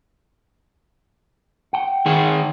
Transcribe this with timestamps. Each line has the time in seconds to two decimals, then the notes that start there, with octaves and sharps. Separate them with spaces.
1.73 F#5 G5
2.06 D#3 G#4